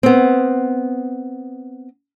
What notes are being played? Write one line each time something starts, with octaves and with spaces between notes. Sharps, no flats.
B3 C4